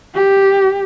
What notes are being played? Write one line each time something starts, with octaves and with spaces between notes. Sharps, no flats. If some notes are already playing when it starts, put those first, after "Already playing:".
G4